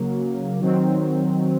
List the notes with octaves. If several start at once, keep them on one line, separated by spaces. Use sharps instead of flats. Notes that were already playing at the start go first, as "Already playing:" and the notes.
Already playing: C#3 F#3 A#3
D#3 F#3 C4